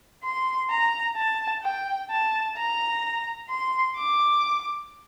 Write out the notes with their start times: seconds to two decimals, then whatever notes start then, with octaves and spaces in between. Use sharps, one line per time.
0.23 C6
0.70 A#5
1.16 A5
1.62 G5
2.10 A5
2.57 A#5
3.49 C6
3.97 D6